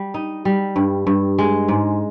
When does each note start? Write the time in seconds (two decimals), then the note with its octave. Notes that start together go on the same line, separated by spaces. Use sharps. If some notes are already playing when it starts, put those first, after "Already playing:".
Already playing: G3
0.14 D#4
0.45 G3
0.76 G2
1.07 G2
1.38 G#3
1.68 G#2